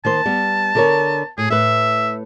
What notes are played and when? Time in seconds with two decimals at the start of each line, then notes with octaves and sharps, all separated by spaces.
0.05 D#3 A#3 C5 A5
0.25 G3 B3
0.75 D3 A#4 C#5
1.38 A2 G#4
1.50 A2 B4 E5